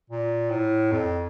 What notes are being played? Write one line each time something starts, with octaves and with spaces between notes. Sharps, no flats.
A#2
A2
F2